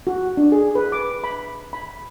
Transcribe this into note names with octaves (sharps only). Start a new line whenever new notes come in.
F#4
D4
G#4
B4
D6
B5
B5